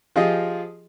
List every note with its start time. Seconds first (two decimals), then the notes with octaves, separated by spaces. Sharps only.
0.16 F3 F4 G4 G#4 D#5